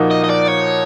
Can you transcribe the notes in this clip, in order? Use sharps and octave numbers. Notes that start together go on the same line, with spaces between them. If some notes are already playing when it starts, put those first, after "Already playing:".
Already playing: A#2 F3 A#3 D#4 F#4
D#5
D#5
D5
C#5